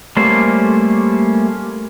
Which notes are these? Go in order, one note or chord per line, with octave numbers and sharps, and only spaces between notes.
G3 A3 A#3 C#4 C5